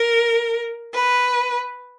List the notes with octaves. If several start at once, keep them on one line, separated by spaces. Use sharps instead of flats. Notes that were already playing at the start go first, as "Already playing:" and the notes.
Already playing: A#4
B4